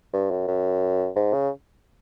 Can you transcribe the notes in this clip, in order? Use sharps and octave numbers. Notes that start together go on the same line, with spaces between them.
G2
F#2
F#2
G#2
C#3